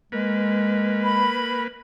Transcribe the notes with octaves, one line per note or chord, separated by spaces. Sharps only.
G#3 A#3 B4
B5